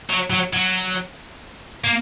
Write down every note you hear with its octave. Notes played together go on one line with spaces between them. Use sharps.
F#3
F#3
F#3
A#3